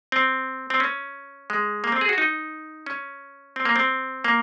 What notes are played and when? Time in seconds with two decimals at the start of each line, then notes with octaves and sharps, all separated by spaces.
0.12 C4
0.70 C4
0.80 C#4
1.50 G#3
1.84 A#3
1.92 C4
2.01 G#4
2.09 F#4
2.18 D#4
2.86 C#4
3.56 C4
3.65 A#3
3.76 C4
4.24 A#3